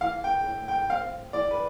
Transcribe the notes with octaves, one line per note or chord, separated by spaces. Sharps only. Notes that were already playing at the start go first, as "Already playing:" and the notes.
E3 F5
G5
A2
G5
C4 F5
E3 D5
B4